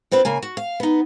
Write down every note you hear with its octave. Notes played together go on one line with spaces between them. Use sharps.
G2 C4 F4 B4
C#3 A#3 G#5
F#4
F5
B3 D#4